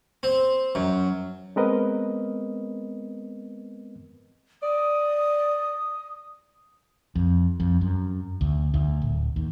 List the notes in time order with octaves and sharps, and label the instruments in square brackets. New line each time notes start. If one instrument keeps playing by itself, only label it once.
[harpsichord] C4
F#2
[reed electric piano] G#3 B3 C4 A#4 B4 D#5
[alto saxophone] D5 [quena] D#6
[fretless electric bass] F2
F2
F#2
D2
D2
D1
D#2